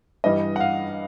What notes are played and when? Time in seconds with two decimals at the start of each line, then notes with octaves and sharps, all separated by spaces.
0.24 G2 E3 G3 D#5
0.56 F#5
0.60 F5